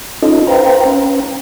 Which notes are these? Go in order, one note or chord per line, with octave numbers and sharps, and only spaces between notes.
C#4 D#4 F4 A4 D#5
B4 C5 F5 G5 A#5
C#4